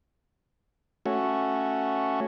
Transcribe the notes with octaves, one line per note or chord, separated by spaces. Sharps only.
A3 C#4 F#4